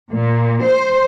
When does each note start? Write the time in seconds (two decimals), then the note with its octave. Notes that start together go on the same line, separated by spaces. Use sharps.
0.11 A#2
0.64 C5